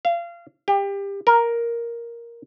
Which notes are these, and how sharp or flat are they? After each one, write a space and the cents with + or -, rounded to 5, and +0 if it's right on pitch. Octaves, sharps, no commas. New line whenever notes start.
F5 -30
G4 +25
A#4 +5